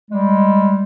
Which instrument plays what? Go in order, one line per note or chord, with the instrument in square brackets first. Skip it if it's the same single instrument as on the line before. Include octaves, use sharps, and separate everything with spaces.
[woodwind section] G3 G#3